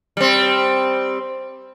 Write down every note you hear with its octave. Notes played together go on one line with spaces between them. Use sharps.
G3 C4